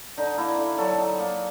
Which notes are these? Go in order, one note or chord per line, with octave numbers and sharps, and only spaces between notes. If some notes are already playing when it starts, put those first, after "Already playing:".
D3 D#4
A#3 E4
D3
F#3 A4
D#4
A#3